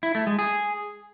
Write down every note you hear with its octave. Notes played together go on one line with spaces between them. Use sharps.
E4
A3
G#3
G#4